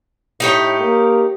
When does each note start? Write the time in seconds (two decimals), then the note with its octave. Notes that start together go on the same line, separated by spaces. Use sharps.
0.40 A2 D#4 G4 C#5
0.80 A#3